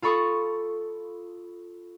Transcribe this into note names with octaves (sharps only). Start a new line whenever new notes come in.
F4 A4 B5 C#6 D#6